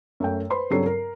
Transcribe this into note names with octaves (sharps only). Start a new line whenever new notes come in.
F#2 A3 G5
B4 C5 B5 C6
G2 C#3 F#3 C4 A4 C7
A#4 A#5